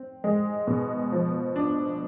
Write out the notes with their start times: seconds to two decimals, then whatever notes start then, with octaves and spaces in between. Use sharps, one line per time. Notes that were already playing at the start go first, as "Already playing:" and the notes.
Already playing: C4
0.24 G#3
0.67 B2
1.12 F3
1.56 D4